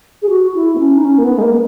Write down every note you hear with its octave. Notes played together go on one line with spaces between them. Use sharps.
G#4
F#4
E4
B3
C#4
D#4
C#4
A#3
B3
G#3
A#3